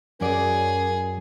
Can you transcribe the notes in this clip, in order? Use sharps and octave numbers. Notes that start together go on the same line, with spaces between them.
F#2 C#4 F#4 G#4 A#4 D5